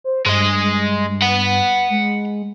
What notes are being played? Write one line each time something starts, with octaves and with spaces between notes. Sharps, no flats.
C5
G2 G#3 D#5
F#5 B5
G#3